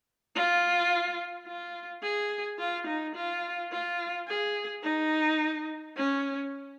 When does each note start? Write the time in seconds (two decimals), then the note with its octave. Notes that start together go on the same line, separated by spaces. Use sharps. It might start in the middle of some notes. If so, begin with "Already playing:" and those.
0.35 F4
1.47 F4
2.03 G#4
2.59 F4
2.87 D#4
3.15 F4
3.72 F4
4.28 G#4
4.83 D#4
5.96 C#4